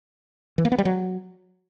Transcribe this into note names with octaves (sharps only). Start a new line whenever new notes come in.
E3
A#3
B3
G3
F#3